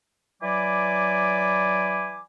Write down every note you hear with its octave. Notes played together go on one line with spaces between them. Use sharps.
E3 F#3 D5 G#5 B5 D6